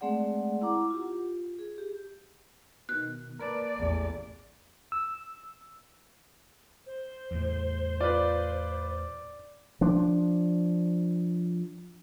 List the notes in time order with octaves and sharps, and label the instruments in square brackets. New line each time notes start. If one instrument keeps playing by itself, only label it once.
[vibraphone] G#3 A3 C4 G#4 D5 F#5
E4 F#5 A#5 D6
F4 G4
G#4
G4
[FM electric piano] B2 D#3 [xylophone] F#6
[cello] A#3 D5 [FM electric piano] A#4 B4 A5
[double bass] A1 E2
[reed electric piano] E6
[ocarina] C5
[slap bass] E2 A2
[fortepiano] F4 B4 [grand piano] D5
[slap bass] F3 D4